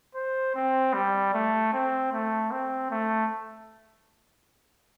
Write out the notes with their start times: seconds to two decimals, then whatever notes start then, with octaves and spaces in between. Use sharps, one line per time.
0.15 C5
0.55 C4
0.94 G3
1.34 A3
1.73 C4
2.13 A3
2.51 C4
2.91 A3